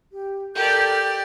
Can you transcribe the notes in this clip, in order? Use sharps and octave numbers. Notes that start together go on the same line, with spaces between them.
G4
G4 A4 A#4 D5 G6